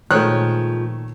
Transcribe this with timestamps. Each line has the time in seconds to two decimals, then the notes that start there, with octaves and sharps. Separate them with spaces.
0.11 A#2 D#3 F3 G#3 A3 C#5 F#6